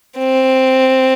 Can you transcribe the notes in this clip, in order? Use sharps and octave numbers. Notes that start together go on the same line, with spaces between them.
C4